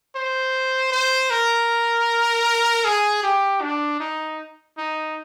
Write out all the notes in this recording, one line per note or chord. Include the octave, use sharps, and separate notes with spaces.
C5
C5
A#4
G#4
G4
D4
D#4
D#4